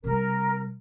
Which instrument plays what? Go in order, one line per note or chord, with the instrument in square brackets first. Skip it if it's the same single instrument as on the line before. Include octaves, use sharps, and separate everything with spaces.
[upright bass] C3 G3 [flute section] A#4